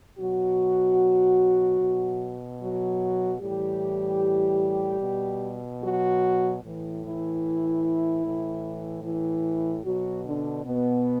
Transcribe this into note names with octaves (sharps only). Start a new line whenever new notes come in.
B2 F#3 F#4
B2
F#3 F#4
A2 E3 G3 G4
B2
F#3 F#4
A2 E3
E3 E4
A2 E3
E3 E4
B2 F#3 F#4
D3 D4
B2 B3